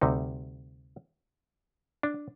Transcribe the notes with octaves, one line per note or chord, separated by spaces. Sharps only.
D2 C3 G3 D#4
D4